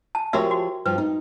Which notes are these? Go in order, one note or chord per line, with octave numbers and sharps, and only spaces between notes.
A5
F3 F#4 G4 A#4 C#5 E5
F#4
G2 F3 B4
D#4